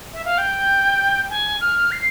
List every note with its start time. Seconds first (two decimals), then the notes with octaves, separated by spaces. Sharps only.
0.14 E5
0.25 F5
0.38 G5
1.30 G#5
1.61 F6
1.92 C7